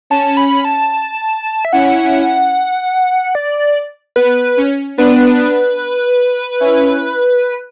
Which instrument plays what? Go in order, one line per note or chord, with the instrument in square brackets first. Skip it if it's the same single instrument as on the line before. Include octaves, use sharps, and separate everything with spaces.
[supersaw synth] C#4 [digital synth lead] A5
[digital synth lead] B5
A5
E5
[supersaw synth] C#4 E4 [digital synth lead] F#5
[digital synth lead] D5
[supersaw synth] B3 [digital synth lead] B4
[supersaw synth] C#4
[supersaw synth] B3 D4 [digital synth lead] B4
[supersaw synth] C#4 E4